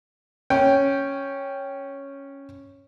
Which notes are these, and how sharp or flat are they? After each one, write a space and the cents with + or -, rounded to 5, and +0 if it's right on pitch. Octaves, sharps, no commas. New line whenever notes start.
C#4 +0 G5 +0